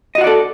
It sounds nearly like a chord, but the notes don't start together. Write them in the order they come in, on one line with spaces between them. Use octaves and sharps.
D#5 F#4 F#5 D5 A4